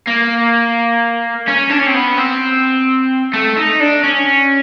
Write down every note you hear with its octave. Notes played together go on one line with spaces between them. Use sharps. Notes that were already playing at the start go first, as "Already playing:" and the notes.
A#3
C#4
D4
C#4
C4
B3
C4
A3
D#4
D4
C#4